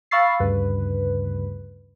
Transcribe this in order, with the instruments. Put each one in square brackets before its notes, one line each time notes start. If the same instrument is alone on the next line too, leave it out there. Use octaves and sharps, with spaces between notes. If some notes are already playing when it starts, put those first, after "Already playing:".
[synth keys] F5 B5 C#6 E6 A6 C7
D2 G2 C#3 B4